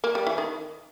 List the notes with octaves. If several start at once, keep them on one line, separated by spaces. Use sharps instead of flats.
A#3
G3
E3
D#3